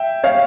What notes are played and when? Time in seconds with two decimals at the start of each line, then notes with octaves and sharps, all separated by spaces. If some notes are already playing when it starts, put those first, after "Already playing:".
Already playing: E5 G5
0.24 C#5 F5